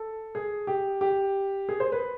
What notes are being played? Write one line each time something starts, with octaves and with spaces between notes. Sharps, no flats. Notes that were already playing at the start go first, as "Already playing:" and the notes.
Already playing: A4
G#4
G4
G4
G#4
C5
B4